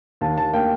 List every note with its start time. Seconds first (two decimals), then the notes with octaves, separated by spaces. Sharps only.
0.21 D#2 A5
0.37 D#2 A5
0.53 A#3 G5